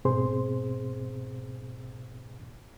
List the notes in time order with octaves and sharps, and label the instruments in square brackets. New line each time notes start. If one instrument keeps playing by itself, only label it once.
[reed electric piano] G#2 B2 C4 G#4 C5 C6